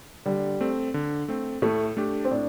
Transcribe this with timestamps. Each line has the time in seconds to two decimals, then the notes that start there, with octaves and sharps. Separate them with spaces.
0.26 D3 G3
0.60 A3 C4
0.94 D3
1.28 A3 C4
1.62 A2 A3
1.97 A3 D4 G4
2.25 C4
2.31 A2 D4